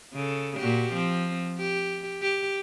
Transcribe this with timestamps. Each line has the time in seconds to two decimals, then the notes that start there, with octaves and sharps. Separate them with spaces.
0.14 C#3 A4
0.58 A#2 F#4 G4
0.93 F3 C4
1.58 G4
2.22 G4